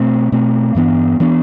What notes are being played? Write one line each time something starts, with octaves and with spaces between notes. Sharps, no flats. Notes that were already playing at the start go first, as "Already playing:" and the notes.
Already playing: B2 A3 C4
B2 A3 C4
G2 E3 B3 D4
E3 B3 D4